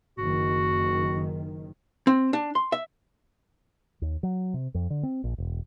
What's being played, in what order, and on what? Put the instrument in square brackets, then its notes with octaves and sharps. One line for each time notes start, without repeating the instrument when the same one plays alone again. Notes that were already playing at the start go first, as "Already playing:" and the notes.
[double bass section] F#1 D#3 [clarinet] F#4
[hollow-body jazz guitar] C4
D4
C6
E5
[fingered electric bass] D#2
F#3
C3
F2
D3
C4
A#1
E1